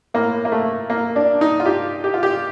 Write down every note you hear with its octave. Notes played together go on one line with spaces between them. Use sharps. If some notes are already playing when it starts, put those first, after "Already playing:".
A2 A#3
A#3
A3
A#3
D4
D#4
F4
G4
G4
F4
G4